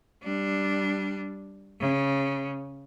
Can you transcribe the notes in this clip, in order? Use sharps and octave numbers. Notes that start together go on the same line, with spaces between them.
G3 D4
C#3